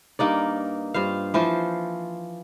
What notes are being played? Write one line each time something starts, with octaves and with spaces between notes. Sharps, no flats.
G2 A#3 D#4 D5
G2 F4 C5 F5
E3 F3 F4 C5